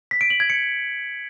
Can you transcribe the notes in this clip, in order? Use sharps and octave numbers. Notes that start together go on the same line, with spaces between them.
B6
D7
F#7
G#6
C#7